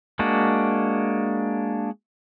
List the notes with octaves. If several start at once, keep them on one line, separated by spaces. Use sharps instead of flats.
G#3 A#3 D4 F#4